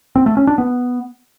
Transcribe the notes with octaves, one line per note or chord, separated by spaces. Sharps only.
C4
A3
C#4
D4
B3